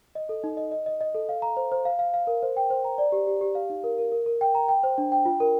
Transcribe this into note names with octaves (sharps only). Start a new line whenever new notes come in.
D#5
A4
D#4
D#5
D#5
D#5
D#5
A4
F5
A#5
C5
C5
F5
F5
F5
A#4
C5
G5
C5
A#5
D5
G4
G4
G4
F5
D#4
A#4
A#4
A#4
A#4
G5
A#5
G5
C5
D4
G5
F4
A#4